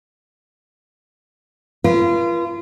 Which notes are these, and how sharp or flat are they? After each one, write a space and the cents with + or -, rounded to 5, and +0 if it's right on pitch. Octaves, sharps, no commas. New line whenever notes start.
F4 -35 B4 -40